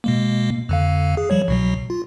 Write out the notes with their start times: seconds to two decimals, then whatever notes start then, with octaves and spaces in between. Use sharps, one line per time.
0.04 B2 G#3 A#3
0.69 F2 D3 F5
1.17 G#4
1.30 F3 G3 C#5
1.48 C2 B2 F#3
1.90 F4